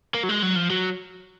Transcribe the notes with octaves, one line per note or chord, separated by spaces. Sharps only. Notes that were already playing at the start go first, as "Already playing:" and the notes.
A#3
F#3
G#3
F#3
F3
F#3